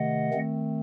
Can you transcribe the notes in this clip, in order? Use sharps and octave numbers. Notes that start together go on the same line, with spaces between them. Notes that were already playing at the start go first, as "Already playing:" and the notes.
Already playing: C3 D#3 A3 D#5 F#5
D#3 A3 C4